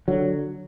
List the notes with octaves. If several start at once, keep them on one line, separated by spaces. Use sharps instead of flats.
D3 F#3